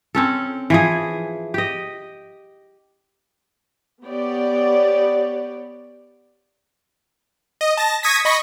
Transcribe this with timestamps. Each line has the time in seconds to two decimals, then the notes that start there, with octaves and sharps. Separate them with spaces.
0.15 C4 C#4 A4
0.70 E3 F3 G#4
1.54 G4 D#5
4.03 B3 G4 C#5 D5
7.61 D#5
7.77 A5 A#6
8.03 C#6 D#6 G#6 A#6 B6
8.25 D#5 B5 C#6 A#6 B6